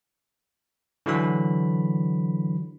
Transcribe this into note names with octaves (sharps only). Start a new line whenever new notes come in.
D3 E3 F#3 B5